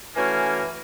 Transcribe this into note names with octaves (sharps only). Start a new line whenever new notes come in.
E3 A3 A#3 C#4 F#4 G#5